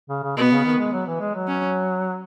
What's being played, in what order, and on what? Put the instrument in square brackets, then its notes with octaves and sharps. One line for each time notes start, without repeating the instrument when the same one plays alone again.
[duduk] C#3
C#3
[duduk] B2 [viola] B3
[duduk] C#3
D#3
G#3
F#3
E3
G#3
F#3
[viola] C#4